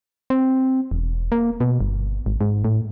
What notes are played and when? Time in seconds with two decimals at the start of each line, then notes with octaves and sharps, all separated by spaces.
0.30 C4
0.91 E1
1.32 A#3
1.61 B2
1.81 G1
2.26 G#1
2.41 G#2
2.65 A2